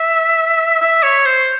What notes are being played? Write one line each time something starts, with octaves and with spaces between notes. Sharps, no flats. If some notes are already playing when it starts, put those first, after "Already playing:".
Already playing: E5
E5
C#5
C5